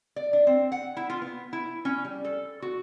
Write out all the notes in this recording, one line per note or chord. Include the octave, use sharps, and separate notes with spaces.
D5
D4
C4
F#5
E4
F4
B3
E4
C#4
G3
A4
F#4